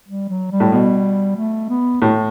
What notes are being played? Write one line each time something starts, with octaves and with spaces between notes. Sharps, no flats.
G3
F#3
G3
A2
B2 G3
A3
B3
A2 A3